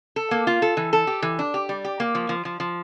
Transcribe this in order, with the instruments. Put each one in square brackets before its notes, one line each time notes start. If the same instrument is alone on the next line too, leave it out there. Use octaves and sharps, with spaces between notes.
[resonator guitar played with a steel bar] A4
A#3
F4
A4
E3
A4
G4
E3
D4
G4
G3
G4
A#3
F3
F3
F3
F3